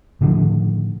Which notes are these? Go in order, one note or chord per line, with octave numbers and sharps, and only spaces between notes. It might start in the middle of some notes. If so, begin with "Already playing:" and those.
A2 D3 D#3 F3